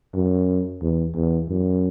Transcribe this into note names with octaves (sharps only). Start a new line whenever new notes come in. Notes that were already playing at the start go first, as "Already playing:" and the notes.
F#2
E2
E2
F#2